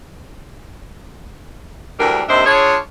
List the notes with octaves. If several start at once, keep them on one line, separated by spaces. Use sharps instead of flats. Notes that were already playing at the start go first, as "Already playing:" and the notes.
D2 E3 G3 D4 A#4
D#2 C3 D4 C5 D#5 E5
D4 F4 G#4 C#5